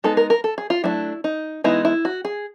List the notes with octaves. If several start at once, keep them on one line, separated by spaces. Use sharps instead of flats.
G#3 B3 D#4 A4
A#4
A#4
A4
G#4
F4
F#3 A3 D4 E4
D#4
E3 G#3 B3 D#4 E4
E4
F#4
G#4